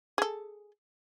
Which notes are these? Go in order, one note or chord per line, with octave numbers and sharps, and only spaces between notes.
G#4 A4